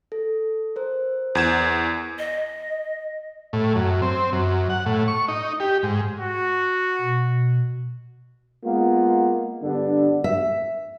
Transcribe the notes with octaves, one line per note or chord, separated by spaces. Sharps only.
A4
A#4 C5
E2 G#6 E7
D#5
A2
F#2
C4
F#2
F#5
A2
C#6
D#4
G4
G#2
F#4
B2
G#3 A#3 B3 F4
G2 D3 B3 D4
E5